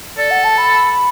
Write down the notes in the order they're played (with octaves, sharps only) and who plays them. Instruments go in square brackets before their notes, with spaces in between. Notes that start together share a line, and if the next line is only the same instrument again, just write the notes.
[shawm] A4 [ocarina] D5
[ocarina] F#5
A5
B5